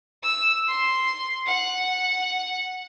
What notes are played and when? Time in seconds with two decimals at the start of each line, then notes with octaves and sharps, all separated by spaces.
0.23 E6
0.68 C6
1.46 F#5